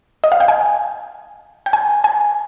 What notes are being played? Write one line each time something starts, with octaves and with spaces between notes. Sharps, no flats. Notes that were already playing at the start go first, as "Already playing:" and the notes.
D#5
F5
G5
G#5
G5
G#5
G#5